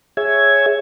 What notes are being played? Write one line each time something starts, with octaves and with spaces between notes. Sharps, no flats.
G#4 C#5 E5 G#6